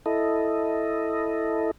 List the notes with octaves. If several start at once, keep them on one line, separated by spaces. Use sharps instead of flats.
E4 A4 D#5